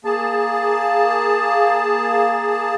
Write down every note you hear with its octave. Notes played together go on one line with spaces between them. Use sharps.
A#3 G#4 A5